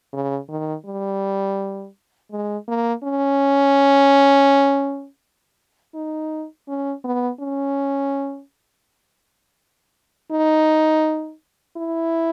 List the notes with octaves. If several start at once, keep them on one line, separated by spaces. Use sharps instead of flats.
C#3
D#3
G3
G#3
A#3
C#4
D#4
C#4
B3
C#4
D#4
E4